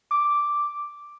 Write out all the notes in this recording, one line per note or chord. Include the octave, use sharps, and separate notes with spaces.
D6